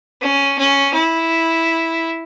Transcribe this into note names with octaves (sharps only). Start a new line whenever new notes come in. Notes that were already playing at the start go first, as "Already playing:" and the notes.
C#4
C#4
E4